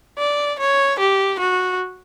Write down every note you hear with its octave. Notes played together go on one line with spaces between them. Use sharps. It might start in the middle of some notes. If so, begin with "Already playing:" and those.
D5
C#5
G4
F#4